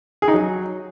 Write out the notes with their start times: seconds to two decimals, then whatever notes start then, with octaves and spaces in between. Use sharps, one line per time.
0.22 G#4
0.28 D#4
0.34 F#3